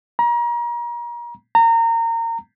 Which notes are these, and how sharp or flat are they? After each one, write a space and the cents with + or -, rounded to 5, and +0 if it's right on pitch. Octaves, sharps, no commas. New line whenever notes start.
A#5 +35
A#5 -25